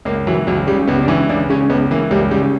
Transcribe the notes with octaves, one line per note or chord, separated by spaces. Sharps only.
C#2 A#3
E3 F#3
C#2 F#3
C#3 G3
C#2 B3
D4
E3 C#4
C#2 D4
C#3 C#4
C#2 B3
E3 A#3
C#2 G3
C#3 G3